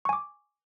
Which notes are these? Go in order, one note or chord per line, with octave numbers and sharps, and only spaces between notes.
G#5 C#6 D6